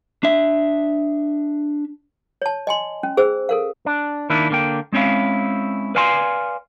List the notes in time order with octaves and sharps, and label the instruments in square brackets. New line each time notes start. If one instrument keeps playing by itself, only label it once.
[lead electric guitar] D4 E5
[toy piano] C#5 A5
D#5 G#5 C6
C#4
G#4 C5 E6
A4 A#4 F5
[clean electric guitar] D4
D#3 A#3 D4 E4
D3 A#3 G5
G#3 C4 C#4 E4 F5
B4 D5 F5 G#5 B5 C6